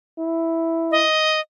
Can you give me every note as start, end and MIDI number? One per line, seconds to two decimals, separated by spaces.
0.18 1.05 64
0.91 1.40 75